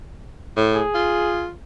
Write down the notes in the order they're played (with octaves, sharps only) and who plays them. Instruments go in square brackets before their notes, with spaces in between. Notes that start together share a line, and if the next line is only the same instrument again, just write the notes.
[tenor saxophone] A2
[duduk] G#4
[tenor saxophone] F4